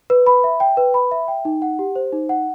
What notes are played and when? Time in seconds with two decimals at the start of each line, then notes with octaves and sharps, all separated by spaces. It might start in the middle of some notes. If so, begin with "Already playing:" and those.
0.10 B4
0.26 B5
0.44 E5
0.60 G5
0.77 B4
0.94 B5
1.11 E5
1.28 G5
1.45 D#4
1.62 F#5
1.79 G4
1.95 C5
2.13 D#4
2.29 F#5